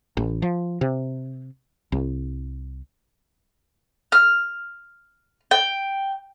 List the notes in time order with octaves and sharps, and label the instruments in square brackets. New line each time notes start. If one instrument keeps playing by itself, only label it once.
[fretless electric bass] A1
F3
C3
C2
[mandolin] F6
G5